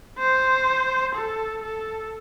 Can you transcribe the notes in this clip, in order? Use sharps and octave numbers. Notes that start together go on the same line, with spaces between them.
C5
A4
A4